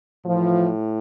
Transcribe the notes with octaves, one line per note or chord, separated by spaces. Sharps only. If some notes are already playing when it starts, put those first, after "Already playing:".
A2 E3 F3